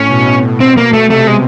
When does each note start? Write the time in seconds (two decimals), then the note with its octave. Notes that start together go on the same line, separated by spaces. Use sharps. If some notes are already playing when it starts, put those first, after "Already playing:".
Already playing: A2 C#4
0.10 B2
0.60 B2 C4
0.77 A#3
0.93 A3
1.10 C3 A3
1.27 G#3